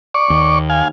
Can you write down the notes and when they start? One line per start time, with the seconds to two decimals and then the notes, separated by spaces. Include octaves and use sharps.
0.14 D5 C#6
0.30 D#2
0.70 F5 G#5